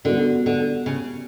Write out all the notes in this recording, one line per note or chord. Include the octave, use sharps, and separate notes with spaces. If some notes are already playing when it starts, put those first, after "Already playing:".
D3 G3 B3 F#4 A#4
D3
C#3